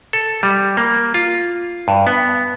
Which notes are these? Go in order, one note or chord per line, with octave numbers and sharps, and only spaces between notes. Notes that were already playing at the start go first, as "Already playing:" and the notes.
A4
G3
A#3
F4
G2
B3